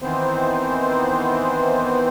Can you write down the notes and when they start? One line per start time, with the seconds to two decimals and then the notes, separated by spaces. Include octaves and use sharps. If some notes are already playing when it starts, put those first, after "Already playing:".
0.02 D#3 E3 B3 C4 C5